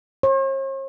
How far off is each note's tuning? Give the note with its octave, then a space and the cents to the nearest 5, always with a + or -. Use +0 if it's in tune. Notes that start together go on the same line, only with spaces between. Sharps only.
C#5 -45